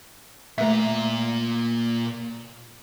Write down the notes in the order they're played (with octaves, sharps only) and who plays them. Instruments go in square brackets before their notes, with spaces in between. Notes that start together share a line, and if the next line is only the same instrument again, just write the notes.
[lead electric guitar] A#2 A#5 [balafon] A3 E5